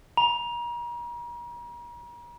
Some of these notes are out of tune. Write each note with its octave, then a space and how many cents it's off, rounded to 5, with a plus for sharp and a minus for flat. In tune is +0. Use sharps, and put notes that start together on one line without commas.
A#5 +40